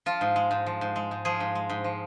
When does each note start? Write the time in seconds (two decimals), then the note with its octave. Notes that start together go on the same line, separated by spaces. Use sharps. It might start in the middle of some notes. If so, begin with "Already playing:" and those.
0.06 F3 F4
0.21 G#2
0.36 G#3
0.51 G#2
0.66 F3
0.81 G#2
0.96 G#3
1.11 G#2
1.25 F3 G#4
1.40 G#2
1.55 G#3
1.69 G#2
1.84 F3